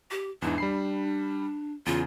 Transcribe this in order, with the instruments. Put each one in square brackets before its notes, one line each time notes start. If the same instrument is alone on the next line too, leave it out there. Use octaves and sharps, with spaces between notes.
[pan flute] G4
[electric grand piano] E2 G#2 E3 [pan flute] D4
[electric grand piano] G3 B5 C7
[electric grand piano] E2 C#3 [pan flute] F4